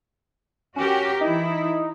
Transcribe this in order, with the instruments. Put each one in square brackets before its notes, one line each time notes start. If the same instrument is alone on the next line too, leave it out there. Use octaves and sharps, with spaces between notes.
[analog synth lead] C#4 [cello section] F#4 G4 A#4
[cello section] E3 E4 [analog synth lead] D#4